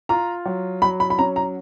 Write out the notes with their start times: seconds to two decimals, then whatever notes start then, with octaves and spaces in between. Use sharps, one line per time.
0.09 F4 A#5
0.46 F#3
0.82 F#3 B5
1.00 B5
1.10 B5
1.19 C#4 A#5
1.36 A#5